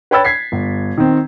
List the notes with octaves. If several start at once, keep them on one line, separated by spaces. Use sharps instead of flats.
B4 C#5 G5 B5 E6 A6
G#6 B6 C7
G1
D#3 C4